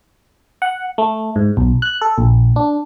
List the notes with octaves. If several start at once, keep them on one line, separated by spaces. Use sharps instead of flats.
F#5
A3
G#2
B1
F#6
A4
A#1
D4